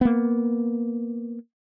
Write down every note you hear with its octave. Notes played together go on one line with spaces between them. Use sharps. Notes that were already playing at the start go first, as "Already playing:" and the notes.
A#3 B3